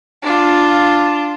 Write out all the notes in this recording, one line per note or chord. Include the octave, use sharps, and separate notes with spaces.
D4 F4